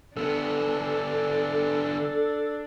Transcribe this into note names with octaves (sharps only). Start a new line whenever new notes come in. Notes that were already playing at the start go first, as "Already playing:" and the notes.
D3 B3 D4 A4